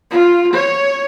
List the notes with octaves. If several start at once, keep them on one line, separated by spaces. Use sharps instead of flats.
F4
C#5